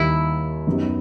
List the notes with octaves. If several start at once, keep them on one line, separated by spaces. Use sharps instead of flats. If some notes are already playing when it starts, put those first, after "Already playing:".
Already playing: D#2 D#3 G3 E4
F#2 F#3 B3 D#4 G4